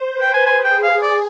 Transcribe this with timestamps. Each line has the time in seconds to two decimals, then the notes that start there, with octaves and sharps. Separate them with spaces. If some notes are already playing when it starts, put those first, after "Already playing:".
Already playing: C5
0.09 B4
0.21 G5
0.34 G#5
0.46 G#4 G#5
0.64 G5
0.83 F5
1.02 D5